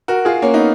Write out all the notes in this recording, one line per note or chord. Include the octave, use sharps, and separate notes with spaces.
F#4 A#4
F4 G#4
A#3 C#4
B3 D#4